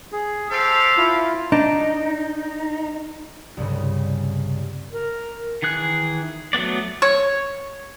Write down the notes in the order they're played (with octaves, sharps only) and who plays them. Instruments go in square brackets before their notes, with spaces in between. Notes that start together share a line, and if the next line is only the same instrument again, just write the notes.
[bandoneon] G#4
[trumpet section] G4 A4 F5 [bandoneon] C5
[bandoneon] E4 F4
[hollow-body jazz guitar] D4 [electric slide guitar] D#4
[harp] C2 G2 C#3
[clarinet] A#4
[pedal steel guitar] D#3 E3 G#4 F#6
F#3 A3 B3 D5
[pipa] C#5